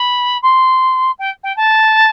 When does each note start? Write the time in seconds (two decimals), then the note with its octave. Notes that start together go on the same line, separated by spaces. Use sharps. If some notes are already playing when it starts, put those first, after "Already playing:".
Already playing: B5
0.42 C6
1.19 G5
1.43 G5
1.56 A5